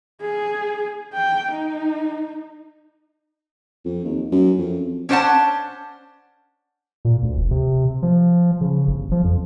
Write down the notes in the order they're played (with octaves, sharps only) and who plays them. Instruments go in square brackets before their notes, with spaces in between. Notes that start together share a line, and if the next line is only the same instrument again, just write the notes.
[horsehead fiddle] G#4
G5
D#4
[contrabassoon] F2
D#2
F#2
F2
[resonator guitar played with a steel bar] C#4 D4 C5 D5 F#5 A5
[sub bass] A#2
D2
F1
C3
F3
C#3
G1
F3
F2